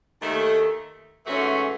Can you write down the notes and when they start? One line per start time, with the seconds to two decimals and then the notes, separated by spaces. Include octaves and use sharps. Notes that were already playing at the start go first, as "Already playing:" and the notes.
0.20 D#2 D#3 A3
1.26 G#2 E3 A3 C#4 F#4